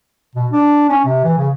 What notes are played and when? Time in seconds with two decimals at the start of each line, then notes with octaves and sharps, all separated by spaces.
0.35 B2
0.51 D4
0.89 C#4
1.05 C3
1.24 E3
1.38 C#3